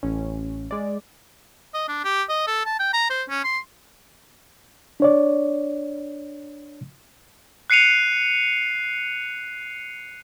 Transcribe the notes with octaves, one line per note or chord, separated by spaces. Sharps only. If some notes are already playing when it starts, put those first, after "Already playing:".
A1 C#4
G#3 D5
D#5
D4
G4
D#5
A4
A5
G5
A#5
C5
C#4
C6
D4 C#5 D5
F#6 C7 C#7 D#7 F7